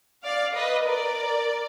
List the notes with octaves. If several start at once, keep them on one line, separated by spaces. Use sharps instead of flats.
D5 F5
B4 D#5
A#4 D5